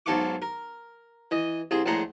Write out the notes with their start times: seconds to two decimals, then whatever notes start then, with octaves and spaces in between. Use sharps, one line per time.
0.06 B1 G#2 A4 F5 C#6 D6
0.42 A#4
1.31 E3 D#5
1.71 C2 G#4 C5
1.86 A#1 A2 G#3 F#5 A#5